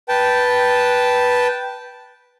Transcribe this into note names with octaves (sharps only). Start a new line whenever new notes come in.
B4 G5 A5